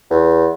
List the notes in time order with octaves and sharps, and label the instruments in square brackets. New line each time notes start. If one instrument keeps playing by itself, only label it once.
[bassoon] E2